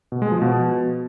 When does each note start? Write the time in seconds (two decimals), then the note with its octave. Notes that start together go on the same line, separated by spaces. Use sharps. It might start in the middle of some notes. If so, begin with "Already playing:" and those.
0.12 B2
0.22 G#3
0.32 F3
0.42 B2